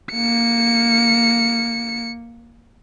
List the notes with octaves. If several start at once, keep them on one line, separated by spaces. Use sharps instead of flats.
A#3 C#7